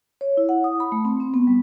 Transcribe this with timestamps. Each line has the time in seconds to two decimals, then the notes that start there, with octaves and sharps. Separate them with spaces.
0.21 C#5
0.37 E4
0.49 F#5
0.64 D#6
0.80 B5
0.92 A3
1.05 C4
1.20 C4
1.34 B3
1.47 G3